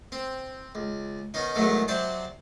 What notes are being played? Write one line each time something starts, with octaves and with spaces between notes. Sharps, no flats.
C4
C#2
B2 D#3 C#4 D#4
E2 G#2 D#3 F#3 A3 A4
C3 F#3 C5 D5 A5